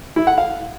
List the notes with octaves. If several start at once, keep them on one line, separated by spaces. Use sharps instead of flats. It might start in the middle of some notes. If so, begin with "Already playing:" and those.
E4
F#5
F5